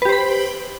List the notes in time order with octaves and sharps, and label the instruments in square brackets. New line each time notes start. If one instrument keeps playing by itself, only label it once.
[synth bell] B4
G4
C5
B5